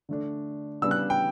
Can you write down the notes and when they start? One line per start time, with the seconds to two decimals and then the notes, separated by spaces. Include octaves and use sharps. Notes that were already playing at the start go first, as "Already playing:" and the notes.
0.09 D3 A3 D4
0.82 C#3 G3 B3 D4 E6
0.91 F#6
1.10 G5